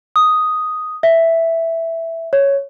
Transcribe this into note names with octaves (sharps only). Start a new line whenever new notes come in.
D#6
E5
C#5